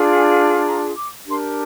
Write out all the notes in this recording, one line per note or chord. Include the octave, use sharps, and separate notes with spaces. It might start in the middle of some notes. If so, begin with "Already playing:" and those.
Already playing: D4 F4 G#4
G#5
A#5
D6
D4 G4 A#4 C6